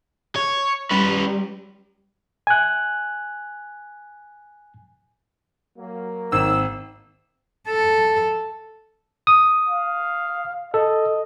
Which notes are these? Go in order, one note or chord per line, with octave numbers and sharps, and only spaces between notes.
C#5
G3 C#4 B4
G#5 F#6
F#3 A#3
G#1 D#4 E6
A4
D#6
F5
A4 D#5